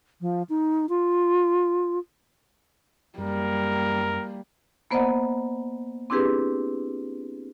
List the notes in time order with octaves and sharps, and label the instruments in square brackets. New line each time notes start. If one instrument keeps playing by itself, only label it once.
[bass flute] F3
D#4
F4
[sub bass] F#2 [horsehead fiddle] G3 A#3 [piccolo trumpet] A#4
[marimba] A#3 B3 C5 D5 D#5 F#5
C4 D4 E4 G4 G#4 B4